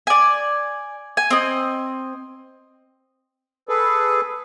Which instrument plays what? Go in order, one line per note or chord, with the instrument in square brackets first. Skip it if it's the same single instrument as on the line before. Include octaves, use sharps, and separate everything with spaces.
[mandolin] D5 G#5
G#5
C4 D#5
[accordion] G#4 A4 B4